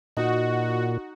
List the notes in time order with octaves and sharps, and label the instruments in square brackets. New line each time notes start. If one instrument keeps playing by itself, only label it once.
[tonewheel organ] A#2 [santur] D#4 [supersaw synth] F#4